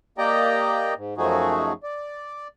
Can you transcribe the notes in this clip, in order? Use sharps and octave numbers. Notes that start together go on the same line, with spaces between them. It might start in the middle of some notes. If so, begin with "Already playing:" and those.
A#3 G4 D5 D#5 G5 A#5
G#2
F#2 F3 A3 D#4 F#4 G#4
D5